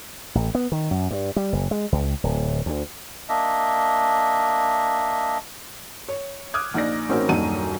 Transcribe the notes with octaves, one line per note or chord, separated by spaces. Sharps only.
A1
B3
D#3
F#2
G2
G3
F#1
G#3
C#2
D1
D2
A#3 D4 D#5 E5
C#5
D6 D#6 F6 F#6 G#6
A#1 D#4 D5 A#6
A1 C4 C#4 D#4 F#4 A#4
D#1 A#1 F#2 D4 D#4 D#7